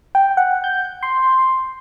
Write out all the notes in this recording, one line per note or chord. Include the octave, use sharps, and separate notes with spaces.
G5
F#5
G6
C6